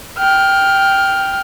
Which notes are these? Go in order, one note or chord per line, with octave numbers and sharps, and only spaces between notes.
G5 F6